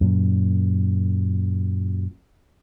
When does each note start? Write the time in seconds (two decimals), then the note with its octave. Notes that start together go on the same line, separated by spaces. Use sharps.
0.01 F#2 A#2